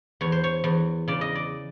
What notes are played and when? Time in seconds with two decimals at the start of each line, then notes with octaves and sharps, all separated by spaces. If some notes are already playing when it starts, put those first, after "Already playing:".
0.21 E2 C#5
0.32 C5
0.44 C#5
0.64 E2
1.08 C#3 D5
1.21 D#5
1.35 D5